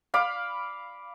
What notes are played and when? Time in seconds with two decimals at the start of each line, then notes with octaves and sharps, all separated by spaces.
0.14 F5 B5 D6